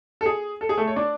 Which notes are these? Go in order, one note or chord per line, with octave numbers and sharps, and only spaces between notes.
A4
G#4
A4
G#4
A3 A4
C#5
D4 D5